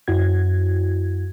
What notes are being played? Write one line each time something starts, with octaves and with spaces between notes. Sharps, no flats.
F#2 E4 F#4 G#6